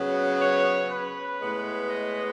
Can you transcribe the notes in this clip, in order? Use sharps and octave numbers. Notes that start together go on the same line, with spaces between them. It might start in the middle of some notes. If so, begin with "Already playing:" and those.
Already playing: C#3 F#3 B3
C#5
B4
A2 G#3 B3
D#5